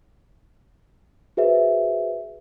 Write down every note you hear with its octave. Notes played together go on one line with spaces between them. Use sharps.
F#4 G#4 B4 C5 E5